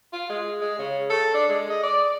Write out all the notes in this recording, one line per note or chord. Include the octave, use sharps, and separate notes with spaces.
F4
G#3
G#3
C#3
A4
D4
G#3
D#5
D5